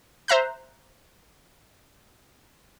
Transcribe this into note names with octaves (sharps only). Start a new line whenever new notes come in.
C5 E5 A#5 F#6